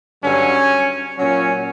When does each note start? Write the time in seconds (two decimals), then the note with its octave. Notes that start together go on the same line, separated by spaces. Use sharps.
0.22 G2 D3 F#3 C#4
1.18 A#2 F#3 C#4